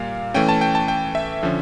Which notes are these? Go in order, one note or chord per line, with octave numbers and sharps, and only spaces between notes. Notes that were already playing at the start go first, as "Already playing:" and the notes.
Already playing: A#2 G3 A#3 F5
E3 A3 C#4 G5
A5
G5
A5
G5
E5
D3 F3 C#4